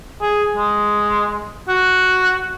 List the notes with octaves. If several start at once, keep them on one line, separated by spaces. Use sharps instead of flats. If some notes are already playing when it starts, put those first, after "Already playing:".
G#4
G#3
F#4